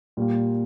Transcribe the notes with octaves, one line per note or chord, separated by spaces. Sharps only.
A#2 G3 A#3